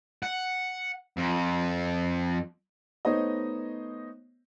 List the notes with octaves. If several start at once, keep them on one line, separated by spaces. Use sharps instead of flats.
F#5
F2
A3 B3 D#4 C5 C#5 D#5